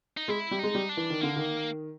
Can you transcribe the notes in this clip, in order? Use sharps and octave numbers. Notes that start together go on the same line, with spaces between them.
D#4
G#3 E4
G3
G#3 D#4
G3
D4
E3
D#3
D3 A#3
D#3